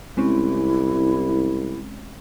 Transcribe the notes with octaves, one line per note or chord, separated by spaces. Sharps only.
C2 G#3 C4 C#4 E4